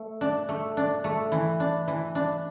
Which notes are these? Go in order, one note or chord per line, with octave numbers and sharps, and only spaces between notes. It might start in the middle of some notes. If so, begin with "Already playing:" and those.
Already playing: A3
D4
A3
D4
A3
E3
D4
E3
D4